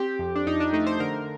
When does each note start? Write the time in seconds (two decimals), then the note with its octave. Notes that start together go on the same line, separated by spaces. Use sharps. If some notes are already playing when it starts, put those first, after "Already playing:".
Already playing: C4 G4
0.19 F2
0.36 D4
0.47 F2 D#4
0.60 D4
0.73 A3 D#4
0.87 C5
1.00 D3 A#4